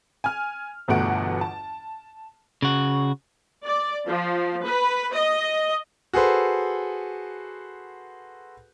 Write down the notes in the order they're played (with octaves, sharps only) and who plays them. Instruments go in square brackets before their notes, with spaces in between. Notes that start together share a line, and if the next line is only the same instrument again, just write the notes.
[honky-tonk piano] G#5 F6
G1 E2 B2 A3 F#5 D7
A5
[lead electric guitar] C#3 F#4
[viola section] D5
F3
B4
D#5
[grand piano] F#4 G#4 A4 B4 C5